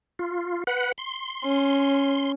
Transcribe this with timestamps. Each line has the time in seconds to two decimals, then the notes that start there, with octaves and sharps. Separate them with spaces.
0.19 F4
0.67 B4 F#5
0.98 C6
1.45 C#4